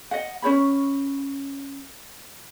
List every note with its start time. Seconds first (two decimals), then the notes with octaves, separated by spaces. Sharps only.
0.11 D#5 F#5
0.42 C#4 C5 C#5 B5